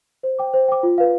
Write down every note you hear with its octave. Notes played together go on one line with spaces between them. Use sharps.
C5
G5 D6
C5
G5 D6
F4
B4 F5